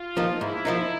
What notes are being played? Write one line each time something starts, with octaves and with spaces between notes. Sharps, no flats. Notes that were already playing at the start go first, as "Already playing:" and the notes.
Already playing: F4
F3 A#3 D#4
G#2 E4
F3 A#3 D#4